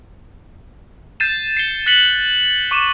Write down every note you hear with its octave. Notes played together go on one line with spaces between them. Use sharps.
G6 A6 C7 D#7 E7
C7 C#7 G7
F#6 A6 B6 C#7 F#7 G7
C#6 D6 D#7 E7